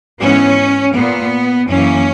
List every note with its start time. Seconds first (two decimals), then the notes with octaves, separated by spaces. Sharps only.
0.21 G#2 E3 B3 C#4
0.95 A#2 A#3 B3
1.70 F#2 E3 A#3 C#4